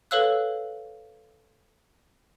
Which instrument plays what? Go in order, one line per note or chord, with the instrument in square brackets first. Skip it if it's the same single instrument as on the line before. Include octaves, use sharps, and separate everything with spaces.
[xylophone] A4 B4 C#5 F5 E6 F#6